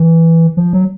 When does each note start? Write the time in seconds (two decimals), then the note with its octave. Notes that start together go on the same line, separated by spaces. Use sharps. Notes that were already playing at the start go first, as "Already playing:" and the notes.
Already playing: E3
0.57 F3
0.73 F#3